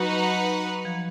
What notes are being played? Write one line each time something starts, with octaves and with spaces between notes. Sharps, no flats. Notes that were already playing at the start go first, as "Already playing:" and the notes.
Already playing: F#3 D#4 F#4 B4 F#5
F3